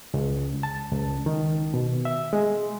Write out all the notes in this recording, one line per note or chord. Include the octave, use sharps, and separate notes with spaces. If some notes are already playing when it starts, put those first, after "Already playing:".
C#2
A5
C#2
D#3
B2
E5
G#3